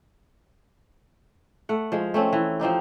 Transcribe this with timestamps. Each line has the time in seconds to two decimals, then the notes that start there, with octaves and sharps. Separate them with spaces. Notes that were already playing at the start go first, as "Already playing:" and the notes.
1.69 A3 F#5
1.92 F3 G#3
2.14 A3 C4 C#4
2.33 E3
2.60 F3 C4 D#4 G4